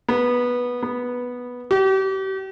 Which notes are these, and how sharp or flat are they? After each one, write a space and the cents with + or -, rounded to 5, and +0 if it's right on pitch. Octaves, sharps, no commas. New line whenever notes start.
B3 -10
B3 -5
G4 -35